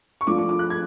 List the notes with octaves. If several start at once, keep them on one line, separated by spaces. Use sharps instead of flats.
C#6
F3 A3 D4 F4 D6
D6
D6
F#6
G#6